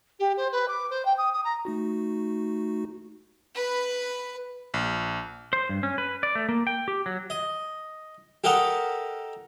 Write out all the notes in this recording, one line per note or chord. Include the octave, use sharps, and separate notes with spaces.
G4
C5
B4
D6
C5
G5
D#6
D#6
A#5
A3 D#4 F#4
B4 B5
A#1
C5
G2
C#4
B4
D5
A3
A#3
G5
G4
F#3
D#5
G4 A4 A#4 D#5 F#5